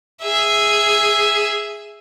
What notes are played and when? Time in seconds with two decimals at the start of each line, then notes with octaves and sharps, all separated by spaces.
0.23 G#4 E5